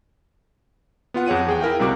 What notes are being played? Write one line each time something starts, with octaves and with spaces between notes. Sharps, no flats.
B3 F4 F#5
F2 G#4 C#5 F#5 D#7
E2 G#4 G5
E4 A#4 F5 G5
C#2 C3 G3 F#4 D6